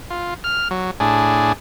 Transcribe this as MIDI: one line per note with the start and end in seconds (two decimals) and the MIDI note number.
0.10 0.34 65
0.44 0.68 89
0.71 0.91 54
1.00 1.52 45
1.00 1.52 62
1.00 1.52 68